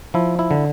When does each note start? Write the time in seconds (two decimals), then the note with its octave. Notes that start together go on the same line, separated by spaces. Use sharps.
0.14 F3 E4
0.39 E4
0.51 D3